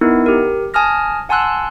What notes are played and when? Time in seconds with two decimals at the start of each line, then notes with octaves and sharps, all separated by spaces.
0.01 B3 D#4 E4 A#4
0.26 G4 A#4
0.74 G#5 A5 D#6 F6 A#6
1.29 F#5 G#5 A5 C6 E6 F#6